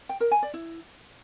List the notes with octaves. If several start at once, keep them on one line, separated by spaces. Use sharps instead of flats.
G5
A#4
G#5
D5
E4